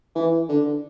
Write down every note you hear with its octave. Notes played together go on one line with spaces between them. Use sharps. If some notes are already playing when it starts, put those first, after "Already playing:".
E3
D3